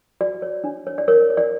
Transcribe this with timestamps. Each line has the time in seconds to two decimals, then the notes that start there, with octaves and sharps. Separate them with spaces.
0.21 F#4 D5
0.42 C#5
0.64 D4
0.87 C#5
0.98 D5
1.08 A#4 C#5
1.30 C#5
1.37 D5